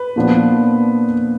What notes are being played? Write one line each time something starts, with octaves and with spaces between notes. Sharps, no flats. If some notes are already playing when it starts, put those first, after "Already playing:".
Already playing: B4
A#2 F3 B3 D4